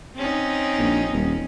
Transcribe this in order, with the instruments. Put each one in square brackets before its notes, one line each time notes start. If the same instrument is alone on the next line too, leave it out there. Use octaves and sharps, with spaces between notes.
[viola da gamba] C4 C#4 D#4
[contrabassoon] A#1
D#1